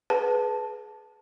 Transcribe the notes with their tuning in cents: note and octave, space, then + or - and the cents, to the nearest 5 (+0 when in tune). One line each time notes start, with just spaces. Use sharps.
G#4 +20 B4 +0 A5 +0